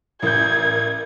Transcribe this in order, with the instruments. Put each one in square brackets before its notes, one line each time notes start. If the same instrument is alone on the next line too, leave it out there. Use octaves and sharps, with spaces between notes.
[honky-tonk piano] A1 G6 [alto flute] A#4 [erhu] G#6